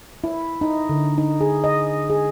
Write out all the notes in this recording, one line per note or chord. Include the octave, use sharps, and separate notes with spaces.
E4
D#4
D3
D#4
G#4
D#5
G#4